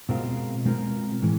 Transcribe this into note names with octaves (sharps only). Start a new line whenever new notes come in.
B2 G#3 C4 F4 A#4
B2 G#3 C4 F4 A#4
A2 E3 G#3